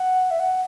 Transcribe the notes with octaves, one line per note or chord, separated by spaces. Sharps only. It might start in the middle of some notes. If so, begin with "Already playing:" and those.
Already playing: F#5
E5
F#5